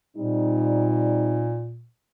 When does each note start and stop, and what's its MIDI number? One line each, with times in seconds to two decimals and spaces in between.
0.17 1.87 46
0.17 1.61 55
0.17 1.61 60
0.17 1.61 63